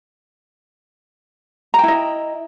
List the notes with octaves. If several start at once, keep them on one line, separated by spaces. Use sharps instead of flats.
E4 D#5 G5 A#5